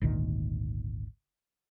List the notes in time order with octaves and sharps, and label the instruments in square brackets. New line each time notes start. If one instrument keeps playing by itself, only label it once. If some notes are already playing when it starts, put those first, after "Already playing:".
[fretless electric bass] G#1 D2 A#2 D#3